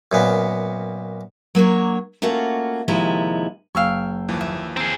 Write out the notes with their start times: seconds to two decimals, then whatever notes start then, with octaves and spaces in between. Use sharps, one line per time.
0.12 F#2 A#2 B3
1.55 F#3 A#3 D4 C#5
2.22 A3 A#3 C#4 F4 F#4
2.88 D#2 C3 F3 G#3 E4 A#5
3.75 F#1 F5 G5 G#5 C#6 E6
4.28 D#2 E3 F3
4.41 E5
4.77 C4 G#4 A#5